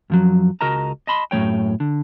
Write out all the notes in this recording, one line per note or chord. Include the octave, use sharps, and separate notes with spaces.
F#2 F3 F#3
C#2 F#4 A#4 D#5 A5 A#5
D#5 A5 B5 C6
F#2 A2 F#3 C#5 G5
D3